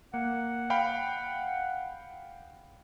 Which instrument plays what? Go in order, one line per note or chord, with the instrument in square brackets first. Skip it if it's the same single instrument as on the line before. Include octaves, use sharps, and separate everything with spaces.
[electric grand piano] A#3 [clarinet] F#5
[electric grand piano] F5 G5 B5